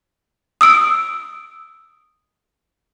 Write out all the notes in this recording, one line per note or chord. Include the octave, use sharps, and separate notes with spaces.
D#6 E6 D7